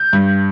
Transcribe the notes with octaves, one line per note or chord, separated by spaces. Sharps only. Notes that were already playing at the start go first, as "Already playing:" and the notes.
Already playing: G6
G2